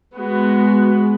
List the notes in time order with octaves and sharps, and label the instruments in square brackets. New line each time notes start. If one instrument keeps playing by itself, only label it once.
[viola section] G#3 B3 F#4